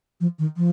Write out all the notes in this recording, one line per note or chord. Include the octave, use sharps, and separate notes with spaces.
F3
D#3
F3